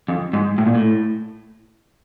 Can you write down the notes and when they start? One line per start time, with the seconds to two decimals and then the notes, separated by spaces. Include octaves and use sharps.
0.08 F2
0.33 G#2
0.58 A2
0.66 A#2
0.75 A2